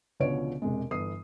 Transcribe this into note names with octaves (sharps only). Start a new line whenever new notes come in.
C#2 B2 D3 F3 C#5 D7
E1 C3 G#3
G1 E3 D#6 C7